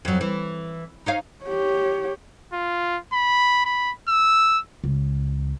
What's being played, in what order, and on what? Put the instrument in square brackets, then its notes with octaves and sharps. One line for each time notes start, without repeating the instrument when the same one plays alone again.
[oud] F2 F#3
E3
D#4 C#5 F5
[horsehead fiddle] G4 C#5
[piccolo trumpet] F4
B5
B5
E6
[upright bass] C#2